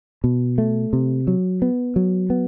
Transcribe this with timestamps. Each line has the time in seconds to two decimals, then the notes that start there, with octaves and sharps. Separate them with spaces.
0.24 B2
0.58 A3
0.93 C3
1.27 F#3
1.62 B3
1.96 F#3
2.30 B3